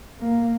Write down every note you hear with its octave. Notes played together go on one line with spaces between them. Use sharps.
A#3